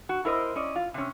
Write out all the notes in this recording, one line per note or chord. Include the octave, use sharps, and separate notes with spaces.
F#4
E4 A#4 C5 D#5
C#4 D5 D#5
F4
C3 C#4